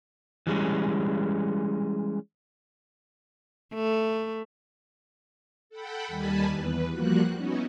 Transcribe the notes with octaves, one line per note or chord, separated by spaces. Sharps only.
E3 G3 G#3 C#4
A3
A4 F#5 G5 B5
D#2 D#3 G3 G#5 A5 B5
E2 B4
F3 G3 A#3 F#4 F#6
B3 C#4 D#4 E4 F#4